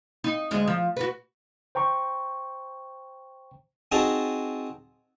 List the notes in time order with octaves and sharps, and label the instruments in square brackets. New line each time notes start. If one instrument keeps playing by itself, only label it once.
[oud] D#4
D2 G#3 D#5
F3
F#4 B4
[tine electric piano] C5 G5 A#5 C#6
[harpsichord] C4 D#4 F#4 G#4 A5 A#5